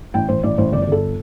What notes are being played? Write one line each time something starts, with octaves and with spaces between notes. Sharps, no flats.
A1 G5
A1 C5
A1 D5
A1 C5
G1 D5
D5
G1 A4